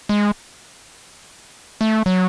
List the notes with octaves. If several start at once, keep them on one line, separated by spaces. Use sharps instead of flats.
G#3
A3
F#3